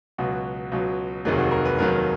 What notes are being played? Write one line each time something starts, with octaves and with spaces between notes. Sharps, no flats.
C#2 B2 F#3 F#4
C#2 B2 F#3
F1 D#2 D#3 F#3 G#4
F#4
A#4
B4
F1 D#2 D#3 F#3 A#4